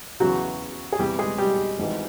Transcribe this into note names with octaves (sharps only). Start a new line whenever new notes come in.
E2 C#3 E3 F#3 F#4
G#4
E2 C3 E3 G3 G4
G#3 G#4
G3 G4
G#1 G#2 E3